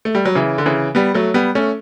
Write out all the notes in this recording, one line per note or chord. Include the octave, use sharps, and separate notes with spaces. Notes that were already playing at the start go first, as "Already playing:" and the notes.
A3
G3
F#3
C#3 E3
D3
C#3 E3
G3 B3
F#3 A3
G3 B3
A3 C#4